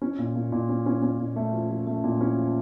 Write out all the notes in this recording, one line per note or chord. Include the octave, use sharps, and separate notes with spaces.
C#4
A#2
A#2
A#2
C#4
C#4
C#4
A#2
A3
F3
F3
A3
A#2
C#4
F3